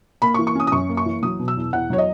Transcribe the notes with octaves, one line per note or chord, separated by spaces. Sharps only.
A#3 B5
C#6
E3
C#6
C#4 D#6
D#6
F#2 C#6
A#3
C#6
E3
F#3 D#6
B2
E6
E2
E2 F#5
F#3 C#5
D#5